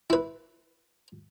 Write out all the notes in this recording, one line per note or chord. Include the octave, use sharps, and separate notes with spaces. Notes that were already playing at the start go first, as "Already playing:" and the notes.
E4 B4